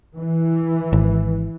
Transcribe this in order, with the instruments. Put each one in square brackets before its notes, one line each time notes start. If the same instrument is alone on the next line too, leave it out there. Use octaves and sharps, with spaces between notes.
[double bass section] E3
[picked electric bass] G#1